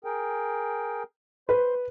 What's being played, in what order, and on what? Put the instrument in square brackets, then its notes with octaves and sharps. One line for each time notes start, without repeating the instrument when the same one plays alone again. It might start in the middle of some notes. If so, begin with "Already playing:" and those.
[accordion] G#4 A#4 G5
[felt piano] B4 [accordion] C5 C6